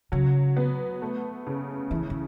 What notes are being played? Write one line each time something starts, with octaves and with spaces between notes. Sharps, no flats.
C#3 F#3
B3
A3
C#3
E3 E4
E3